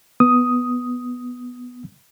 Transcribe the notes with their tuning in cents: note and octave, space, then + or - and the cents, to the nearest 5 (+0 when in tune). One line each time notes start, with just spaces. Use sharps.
B3 +0 D#6 +5